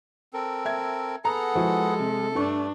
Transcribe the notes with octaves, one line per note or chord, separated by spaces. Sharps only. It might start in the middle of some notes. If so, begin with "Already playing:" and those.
C4 A4 A#4
E5 G#6
B3 G#4 A4 F#5 A#5
F3 G#3 E4 F#4
C3
G2 A3 D4 C#6